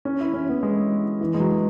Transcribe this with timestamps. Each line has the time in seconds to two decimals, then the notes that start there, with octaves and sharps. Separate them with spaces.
0.05 C#4
0.20 E4
0.34 C#4
0.49 B3
0.63 G#3
1.21 E3
1.34 G#3
1.40 F#3